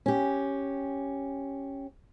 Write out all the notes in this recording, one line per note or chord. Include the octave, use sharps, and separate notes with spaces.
C#4 G4